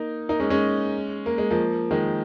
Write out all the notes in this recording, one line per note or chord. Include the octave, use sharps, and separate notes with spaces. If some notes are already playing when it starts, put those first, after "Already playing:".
Already playing: A#3 D#4
A#3 D#4
G#3 C#4
G#3 C#4
A#3
G#3
F3 A#3
D#3 G#3